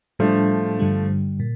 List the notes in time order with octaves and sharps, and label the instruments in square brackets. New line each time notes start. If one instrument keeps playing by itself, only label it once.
[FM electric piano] A2 G3 D4 [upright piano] F3 A3
[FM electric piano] G2 D3 G3
A#2